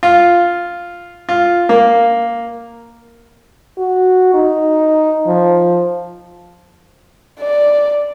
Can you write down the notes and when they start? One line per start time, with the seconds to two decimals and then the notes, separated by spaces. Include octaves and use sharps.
0.03 F4
1.29 F4
1.69 A#3
3.78 F#4
4.34 D#4
5.27 F3
7.40 D5